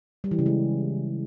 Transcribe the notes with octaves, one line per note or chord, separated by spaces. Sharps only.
G3
E3
C#3
G#3